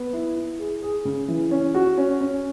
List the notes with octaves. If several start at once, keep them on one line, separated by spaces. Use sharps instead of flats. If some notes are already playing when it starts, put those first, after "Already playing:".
Already playing: B3
E4
E4
G#4
G#4
C#3
E3
C#4
F#4
C#4
C#4